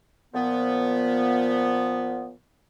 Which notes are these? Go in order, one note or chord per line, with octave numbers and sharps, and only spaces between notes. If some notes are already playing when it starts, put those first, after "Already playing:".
A#2 F3 B3